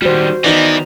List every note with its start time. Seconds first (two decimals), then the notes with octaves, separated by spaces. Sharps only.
0.02 D#3 G3 F#4 C5
0.44 D#3 E3 B3 D5 D#5